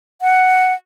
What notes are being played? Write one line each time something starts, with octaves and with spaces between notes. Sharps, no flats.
F#5